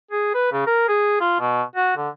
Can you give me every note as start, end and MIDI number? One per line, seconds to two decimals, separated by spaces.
0.11 0.34 68
0.35 0.50 71
0.52 0.64 49
0.67 0.84 70
0.88 1.19 68
1.20 1.38 65
1.40 1.63 47
1.75 1.93 66
1.97 2.09 50